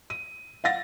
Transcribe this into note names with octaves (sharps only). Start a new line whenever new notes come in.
D#7
F5 F#5 A6 A#6